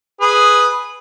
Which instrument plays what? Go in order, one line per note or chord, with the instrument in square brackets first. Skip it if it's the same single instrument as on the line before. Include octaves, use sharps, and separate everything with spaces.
[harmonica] G#4 B4